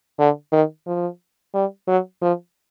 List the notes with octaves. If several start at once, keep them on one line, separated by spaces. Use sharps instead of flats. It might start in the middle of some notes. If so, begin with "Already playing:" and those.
D3
D#3
F3
G3
F#3
F3